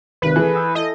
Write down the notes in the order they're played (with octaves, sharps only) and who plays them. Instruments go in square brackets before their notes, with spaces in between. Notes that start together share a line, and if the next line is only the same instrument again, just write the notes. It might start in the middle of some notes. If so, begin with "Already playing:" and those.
[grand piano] G#1 C3 D#3 [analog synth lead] B4
[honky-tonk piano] E3 [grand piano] G#4 A4
[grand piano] D#6 E6 G6
[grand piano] E4 A4 [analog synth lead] D#5